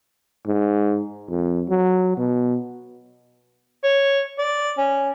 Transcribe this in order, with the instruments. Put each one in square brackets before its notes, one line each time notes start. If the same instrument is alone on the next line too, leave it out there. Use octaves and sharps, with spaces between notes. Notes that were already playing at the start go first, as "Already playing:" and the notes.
[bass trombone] G#2
F2
F#3
B2
[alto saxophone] C#5
D5
C#4